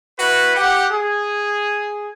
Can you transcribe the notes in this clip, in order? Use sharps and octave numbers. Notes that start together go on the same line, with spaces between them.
E4 F#4 B4
G4 F#5
G#4